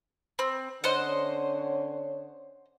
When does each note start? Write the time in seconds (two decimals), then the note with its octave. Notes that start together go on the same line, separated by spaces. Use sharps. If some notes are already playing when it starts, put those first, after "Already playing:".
0.39 C4
0.84 D3 C#4 C5 C#5 D#5 F#5